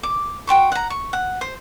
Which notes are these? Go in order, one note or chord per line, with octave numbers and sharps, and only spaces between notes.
D6
F#4 G5 C6 C#6
F#5 A#5
C#6
F#5
C5